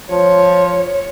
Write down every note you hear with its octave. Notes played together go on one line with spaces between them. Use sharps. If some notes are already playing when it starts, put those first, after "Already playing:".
F3 C#5